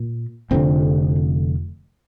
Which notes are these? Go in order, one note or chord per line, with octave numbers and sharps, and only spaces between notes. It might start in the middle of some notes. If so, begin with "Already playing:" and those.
Already playing: A#2
F1 F2 D3 C4